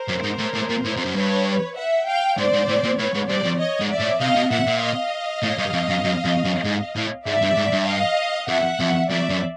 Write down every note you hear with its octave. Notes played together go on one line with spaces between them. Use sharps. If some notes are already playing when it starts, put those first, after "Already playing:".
Already playing: A#4 C5
F#2
G#2
A2
A2
A#2
A2
F2
F#2
G2 B4 C#5
E5 F#5
F5 G5
G#2 C5 D5
G#2
A2
A#2
A2 B4 C#5
G#2
G2 C5 D5
F2
C#5 D#5
G#2
D5 E5
A2
C3 D#5 F5
B2
A#2 E5 F#5
A#2
D#5 F5
A2
G2
F2
F#2
F#2
F2
F#2
G#2
A2
G#2 D5 E5
G2
G#2
G2
D#5 F5
F2 E5 F#5
F2
F2 D5 E5
F#2